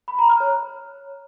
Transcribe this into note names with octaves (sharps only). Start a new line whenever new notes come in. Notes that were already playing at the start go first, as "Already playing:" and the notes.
B5
A#5
F6
C#5